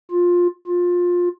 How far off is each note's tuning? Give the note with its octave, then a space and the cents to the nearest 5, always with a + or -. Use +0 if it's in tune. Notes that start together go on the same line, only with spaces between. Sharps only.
F4 +15
F4 +20